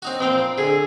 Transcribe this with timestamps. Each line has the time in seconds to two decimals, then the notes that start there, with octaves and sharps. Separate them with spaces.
0.02 C4 D#4 F#4
0.20 A#1 C4 F5
0.58 D3 G#4